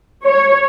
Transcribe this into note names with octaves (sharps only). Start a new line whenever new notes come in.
C#5